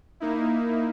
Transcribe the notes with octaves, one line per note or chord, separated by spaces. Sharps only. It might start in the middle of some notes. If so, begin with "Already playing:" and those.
A#3 D#4 E4